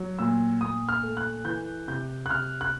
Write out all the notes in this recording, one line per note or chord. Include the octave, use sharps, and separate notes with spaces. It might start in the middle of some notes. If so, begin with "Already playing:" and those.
Already playing: F#3
A#2 E6
A#2 D#6
F6
A3
F#6
E3 G6
C3 G6
F#6
C3 F6
F#6